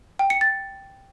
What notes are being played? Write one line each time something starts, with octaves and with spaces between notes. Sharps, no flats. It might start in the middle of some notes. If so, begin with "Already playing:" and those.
G5
C#7
A6